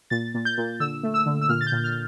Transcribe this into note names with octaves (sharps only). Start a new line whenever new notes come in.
A#2 A6
A#2
G6
A#2
D3 E6
A3
E6
D3
E6
A#2 F6
A6
G6
A#2
F6